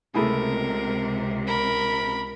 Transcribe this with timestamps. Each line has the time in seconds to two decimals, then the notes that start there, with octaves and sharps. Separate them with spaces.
0.15 C#2 C3 A3 E4 G#4 A#4
1.47 A#4 B5